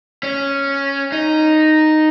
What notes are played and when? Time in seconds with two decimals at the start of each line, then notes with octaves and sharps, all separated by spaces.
0.23 C#4
1.12 D#4